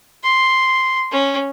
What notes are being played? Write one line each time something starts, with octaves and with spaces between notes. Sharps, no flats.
C6
C#4